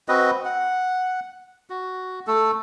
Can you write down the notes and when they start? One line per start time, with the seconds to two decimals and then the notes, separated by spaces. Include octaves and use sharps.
0.08 C4 F#4 B4 D#5
0.45 F#5
1.70 F#4
2.27 A3 A4